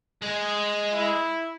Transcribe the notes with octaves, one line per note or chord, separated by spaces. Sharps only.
G#3 G#4
E4